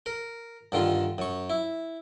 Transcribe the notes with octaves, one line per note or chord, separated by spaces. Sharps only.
A#4
G2 D3 D#3 F4
F#2 C#6
E4